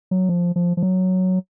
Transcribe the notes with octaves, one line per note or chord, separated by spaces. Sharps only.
F#3
F3
F3
F3
F#3